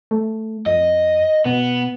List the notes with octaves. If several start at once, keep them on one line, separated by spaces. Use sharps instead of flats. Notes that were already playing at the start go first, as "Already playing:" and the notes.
A3
F2 D#5
B2 B3